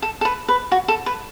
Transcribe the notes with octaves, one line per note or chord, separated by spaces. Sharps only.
A4
A4
B4
B4
F#4
A4
B4